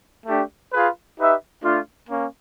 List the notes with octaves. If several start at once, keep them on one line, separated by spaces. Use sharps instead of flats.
A3 D4 G4
F4 G#4 B4
D#4 G4 B4 E5
A3 D4 F4
A#3 C#4